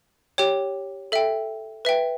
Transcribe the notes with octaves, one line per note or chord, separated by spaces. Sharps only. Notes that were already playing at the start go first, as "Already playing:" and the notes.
G4 C#5 G5
A4 E5 G5
B4 E5 G5